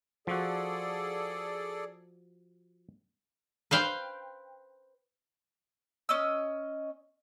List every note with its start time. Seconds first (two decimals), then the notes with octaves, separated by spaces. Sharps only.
0.27 F3 F#4 G#4 A4 D5
3.71 B4 C5 F5 G5
6.09 C#4 D#5 E6